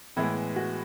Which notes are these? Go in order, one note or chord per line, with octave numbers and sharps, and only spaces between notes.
A2 E3 G#3 B3 E4
F#4